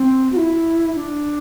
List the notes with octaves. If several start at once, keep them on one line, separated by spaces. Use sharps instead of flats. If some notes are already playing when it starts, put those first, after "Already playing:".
Already playing: C4
F#4
E4
D4